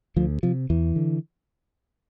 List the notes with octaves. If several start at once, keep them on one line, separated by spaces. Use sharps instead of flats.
D2 F3
C3 F3
E2 E3
D3